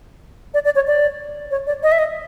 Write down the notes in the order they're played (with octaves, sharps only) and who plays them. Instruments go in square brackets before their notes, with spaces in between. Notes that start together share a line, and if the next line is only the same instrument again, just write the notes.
[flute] D5
D5
C#5
D5
C#5
D5
D#5
E5
D#5